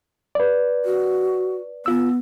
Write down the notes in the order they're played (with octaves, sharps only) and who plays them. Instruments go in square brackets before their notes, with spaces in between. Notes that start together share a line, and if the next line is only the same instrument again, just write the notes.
[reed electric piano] B4 D5
[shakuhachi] F#4
[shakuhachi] B3 [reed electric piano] F4 E6